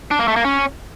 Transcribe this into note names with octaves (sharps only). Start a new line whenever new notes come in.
D4
A#3
A3
A#3
C#4